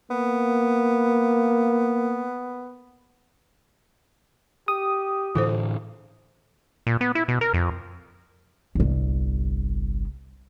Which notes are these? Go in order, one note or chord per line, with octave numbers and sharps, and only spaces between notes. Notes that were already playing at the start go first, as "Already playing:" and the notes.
A#3 B3
G4 D#6
A2 D3 E3 F4 A4 C5
A#2
B3
E4
B2
A#4
F2
G1 C2